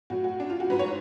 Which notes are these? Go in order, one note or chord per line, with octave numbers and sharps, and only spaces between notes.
A2 F#3 F#4
F#4
D4
F4
F#4
G#2 F#3 B4
C#5